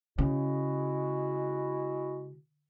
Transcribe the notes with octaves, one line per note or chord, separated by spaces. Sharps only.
C#3 G#3 E4 F#4